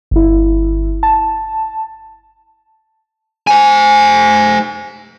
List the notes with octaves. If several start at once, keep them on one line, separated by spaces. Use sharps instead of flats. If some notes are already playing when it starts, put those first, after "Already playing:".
G1 E4
A5
C5 G#5